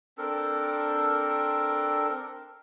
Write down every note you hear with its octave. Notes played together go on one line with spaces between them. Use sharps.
C4 D4 A4 A#4